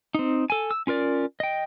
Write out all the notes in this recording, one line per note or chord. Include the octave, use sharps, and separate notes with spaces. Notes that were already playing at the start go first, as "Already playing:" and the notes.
C4 D#4
A4 G#5
E6
C#4 F4 A#4 D5
D#5 G5